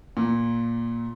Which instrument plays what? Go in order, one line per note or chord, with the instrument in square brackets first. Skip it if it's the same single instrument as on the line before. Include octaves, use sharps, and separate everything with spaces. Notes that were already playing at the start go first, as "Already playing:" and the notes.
[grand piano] A#2